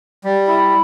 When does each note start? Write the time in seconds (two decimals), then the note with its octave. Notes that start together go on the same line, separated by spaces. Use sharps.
0.24 G3
0.47 E4